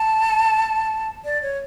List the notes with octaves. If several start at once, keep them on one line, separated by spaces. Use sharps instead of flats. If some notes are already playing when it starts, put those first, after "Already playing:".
Already playing: A5
D5
C#5